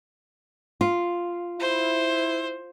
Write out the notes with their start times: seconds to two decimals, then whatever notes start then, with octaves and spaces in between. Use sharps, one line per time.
0.81 F4
1.59 E4 C5